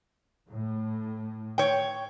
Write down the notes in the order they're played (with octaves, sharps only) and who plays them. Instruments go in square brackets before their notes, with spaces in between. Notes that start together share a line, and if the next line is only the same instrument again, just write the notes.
[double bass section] A2
[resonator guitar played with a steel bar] C#5 G5